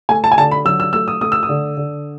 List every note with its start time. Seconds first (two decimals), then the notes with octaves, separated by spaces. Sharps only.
0.09 A3 G#5
0.24 A5
0.32 G#5
0.38 D3 A5
0.51 B5
0.65 F#3 E6
0.80 E6
0.93 A3 E6
1.08 D#6
1.21 A3 D#6
1.32 E6
1.43 D#6
1.49 D3
1.77 D3